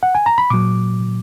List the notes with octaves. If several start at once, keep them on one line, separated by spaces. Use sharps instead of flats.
F#5
G#5
A#5
B5
A#2 F#3 D6